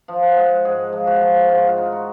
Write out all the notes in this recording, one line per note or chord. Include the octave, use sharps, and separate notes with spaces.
F3
F#5
G#3
G#2 G#4
F3
F#4
F3
G#2 F4
F#4
F4
D#4
F#4